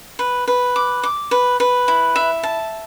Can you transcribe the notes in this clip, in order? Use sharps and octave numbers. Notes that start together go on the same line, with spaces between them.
B4
B4
D6
D6
B4
B4
E4
E5
A5